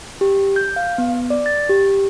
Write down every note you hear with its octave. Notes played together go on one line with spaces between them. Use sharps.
G4
G6
F5
B3
D5
A6
G4